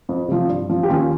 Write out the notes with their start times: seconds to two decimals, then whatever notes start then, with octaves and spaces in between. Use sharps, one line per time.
0.09 F2
0.28 C3 F3
0.49 G2
0.69 F3
0.83 G4
0.89 D#2 C#4 F4